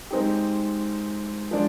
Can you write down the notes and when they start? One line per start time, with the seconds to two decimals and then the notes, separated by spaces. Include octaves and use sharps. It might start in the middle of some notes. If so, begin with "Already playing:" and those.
0.11 G#3 C4 D#4 G4
1.51 F3 G#3 D4 D5